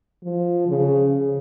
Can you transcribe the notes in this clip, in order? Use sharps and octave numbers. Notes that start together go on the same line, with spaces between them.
F3
C#3